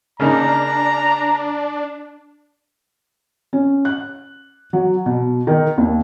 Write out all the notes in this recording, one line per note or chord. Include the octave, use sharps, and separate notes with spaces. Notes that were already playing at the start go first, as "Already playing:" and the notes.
C#3 A#3 D4 D#4 A#5
C#4
F#6
F#3
B2
D#3
D#2